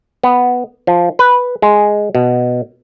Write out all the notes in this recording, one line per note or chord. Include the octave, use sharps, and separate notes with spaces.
B3
F3
B4
G#3
B2